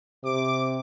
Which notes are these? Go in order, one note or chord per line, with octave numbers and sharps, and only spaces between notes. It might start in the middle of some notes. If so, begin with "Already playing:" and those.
C3 D6